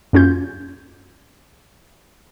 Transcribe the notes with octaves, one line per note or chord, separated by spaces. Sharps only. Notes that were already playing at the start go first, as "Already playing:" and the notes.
F#2 A#3 C#4 F4 F#4 G6